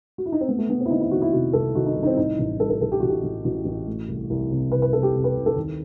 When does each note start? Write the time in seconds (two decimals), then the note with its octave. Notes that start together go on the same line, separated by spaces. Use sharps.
0.18 F#4
0.26 E4
0.32 D#4
0.41 C4
0.48 A3 B3
0.58 A3
0.69 A3 B3
0.80 C4
0.86 E4
0.91 D#3 D#4
1.01 E4
1.11 D#3 F#4
1.22 E4
1.32 C3 F#4
1.53 C2 A4
1.75 D#3 F#4
1.86 D#4
1.96 C2
2.03 D#4
2.07 C4
2.17 A2 D#4
2.39 A1
2.60 G3 A4
2.70 A4
2.81 A1 A4
2.92 G4
3.00 A1 F#4
3.08 G4
3.24 A1
3.44 A1 F#4
3.65 A1
3.86 A3
4.08 C2
4.30 C2
4.51 C3
4.72 C3 B4
4.82 B4
4.93 C3 A4
5.03 G4
5.14 C3
5.24 B4
5.35 C2
5.46 A4
5.56 D#2